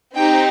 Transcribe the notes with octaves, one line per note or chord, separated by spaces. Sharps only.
C4 D#4 G4 G5